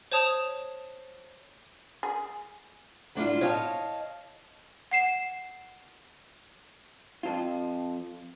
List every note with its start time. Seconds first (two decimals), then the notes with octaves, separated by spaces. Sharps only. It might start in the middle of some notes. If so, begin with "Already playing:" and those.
0.12 C5 C#5 A5 D#6 F7
2.03 G#4
3.15 F#3 D4 E4 F4
3.41 C#5 D#5 F5 F#5 A5
4.91 F#5 C7 E7
7.23 F2 F4